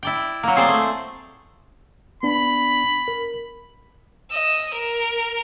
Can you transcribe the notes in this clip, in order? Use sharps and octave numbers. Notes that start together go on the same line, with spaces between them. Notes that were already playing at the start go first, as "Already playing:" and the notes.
E4 D5 G5
F#3 A#3
C4 G#4 C5 D5
A3
B3 D4 B5
A#4
D#5 E6
A#4